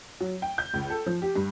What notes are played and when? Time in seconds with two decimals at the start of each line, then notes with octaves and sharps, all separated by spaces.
0.20 F#3
0.42 G5
0.58 G6
0.73 C#2
0.90 A4
1.07 F3
1.22 G4
1.36 G2